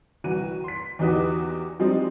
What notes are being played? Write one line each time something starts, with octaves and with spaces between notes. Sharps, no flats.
C2 E3 F#4 D#7
C6 B6
E2 E3 D#4 F#4 G4 D#6
F3 G3 G#3 C4 D4 D#4